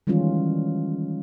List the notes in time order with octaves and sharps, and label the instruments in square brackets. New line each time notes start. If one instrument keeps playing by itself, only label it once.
[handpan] D#3 E3 G3 G#3 C#4 F4